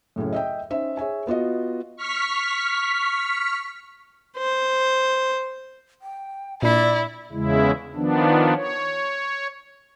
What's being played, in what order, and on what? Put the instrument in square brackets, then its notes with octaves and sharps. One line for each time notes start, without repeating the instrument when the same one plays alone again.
[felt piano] F#2 A2 C#3 C#4
D#5 E5 G5
C#4 D#4 C5 E5
G#4 C#5 E5 G#5
B3 F4 F#4 D#5
[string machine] C#6 F6 B6
[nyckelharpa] C5
[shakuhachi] G5
[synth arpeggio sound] A#2 D4 B6 [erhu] E4 [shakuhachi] D5
[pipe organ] E2 C#3 G#3 E4
D#3 F3 B3 D4
C#5